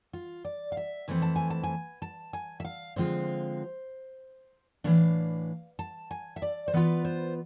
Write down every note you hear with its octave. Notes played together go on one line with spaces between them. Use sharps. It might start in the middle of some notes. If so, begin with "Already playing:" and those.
F4
D5
F5
E5
F2 E3 A3 C4 G#5
A5
G#5
A5
G#5
A5
G#5
E5
F5
D3 F3 G#3 C4 F4 C5
A2 E3 A3 D4 F5
A5
G#5
E5
D5
C5
E3 B3 F4 B4
C5